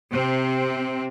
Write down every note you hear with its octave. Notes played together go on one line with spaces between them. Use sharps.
C3 C4